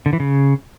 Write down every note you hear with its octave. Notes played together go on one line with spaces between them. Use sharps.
D3
E3
C#3